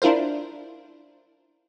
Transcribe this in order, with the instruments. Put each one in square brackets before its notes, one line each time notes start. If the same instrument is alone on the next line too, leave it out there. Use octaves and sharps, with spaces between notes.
[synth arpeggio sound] D4 E4 F4 A#4 C5